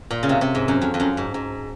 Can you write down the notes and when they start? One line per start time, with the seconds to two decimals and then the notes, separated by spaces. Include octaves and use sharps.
0.11 A#2
0.23 C#3
0.29 C3
0.41 C3
0.55 G#2
0.68 F#2
0.81 F2
0.94 F2
1.00 F#2
1.17 G#2
1.34 G#2